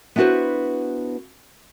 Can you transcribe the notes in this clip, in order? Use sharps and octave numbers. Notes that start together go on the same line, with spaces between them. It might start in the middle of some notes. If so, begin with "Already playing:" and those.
B3 D4 E4 F#4 B4 C5